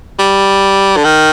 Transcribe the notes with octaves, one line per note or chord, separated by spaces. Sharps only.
G3
D3
D#3